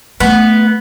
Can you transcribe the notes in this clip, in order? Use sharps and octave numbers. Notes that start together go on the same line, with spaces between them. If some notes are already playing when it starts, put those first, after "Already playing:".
A3 B3